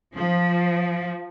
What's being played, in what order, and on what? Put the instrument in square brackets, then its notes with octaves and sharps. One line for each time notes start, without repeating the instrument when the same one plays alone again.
[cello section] F3